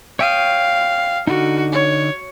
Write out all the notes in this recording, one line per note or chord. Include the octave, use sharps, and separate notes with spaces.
C#5 F5 G5 D#6
D3 D#4 F#4
C#5